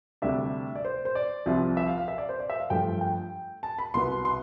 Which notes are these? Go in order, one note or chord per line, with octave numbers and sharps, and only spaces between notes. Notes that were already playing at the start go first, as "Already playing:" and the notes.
D2 C3 G3 D4 E5
D5
C5
C5
D5
C2 C3 F3
E5
F5
F5
E5
D5
C5
D5
E5
F5
G2 F3 A3 G5
G5
A5
B5
C2 B2 B3 C6
C6